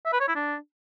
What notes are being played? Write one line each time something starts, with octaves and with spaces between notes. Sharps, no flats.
E5
B4
C#5
E4
D4